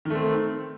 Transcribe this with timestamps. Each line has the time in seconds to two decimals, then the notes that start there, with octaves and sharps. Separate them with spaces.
0.05 D#3
0.10 A3
0.15 C4